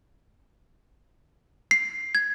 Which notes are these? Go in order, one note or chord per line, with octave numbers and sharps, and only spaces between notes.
C7
G#6